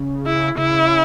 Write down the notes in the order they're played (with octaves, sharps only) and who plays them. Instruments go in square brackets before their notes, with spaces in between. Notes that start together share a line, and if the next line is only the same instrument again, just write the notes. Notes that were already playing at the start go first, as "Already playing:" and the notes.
Already playing: [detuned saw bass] C#3
[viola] E4
[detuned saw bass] C#3 [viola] E4